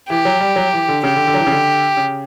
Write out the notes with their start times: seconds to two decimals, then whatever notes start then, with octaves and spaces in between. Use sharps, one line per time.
0.09 E3 G4
0.25 F#3
0.41 G3
0.56 F#3
0.73 E3
0.88 D3
1.04 C#3 G4
1.16 D3
1.27 D3
1.34 F#3
1.39 E3
1.46 C#3
1.51 D3
1.97 C#3